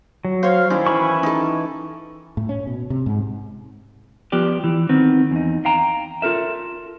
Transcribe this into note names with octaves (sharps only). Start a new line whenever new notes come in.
F#3
C5 C#5 F5
D#3 C#4 D#4 E4 C5 D5
E3 B5 C#6
D#4 A4
A2
C#4
B2
C3
G#2
F3 B3 G4 D5
E3
D#3 B3 C4
E2 D#4
F5 G5 A#5
F4 A4 A#4 E5